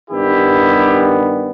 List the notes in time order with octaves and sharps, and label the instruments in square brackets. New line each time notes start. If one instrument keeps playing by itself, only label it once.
[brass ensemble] G2 D#3 G3 B3 E4 G4